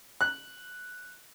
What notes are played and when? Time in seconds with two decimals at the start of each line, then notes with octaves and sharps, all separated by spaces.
0.21 F#6